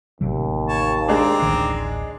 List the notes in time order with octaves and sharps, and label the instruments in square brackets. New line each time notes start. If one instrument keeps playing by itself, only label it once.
[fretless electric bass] A1 C3 F#3 [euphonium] D#2
[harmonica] C#5 A5
[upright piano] G#3 D4 [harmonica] C4 D5 A#5
[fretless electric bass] D1 A1 D#3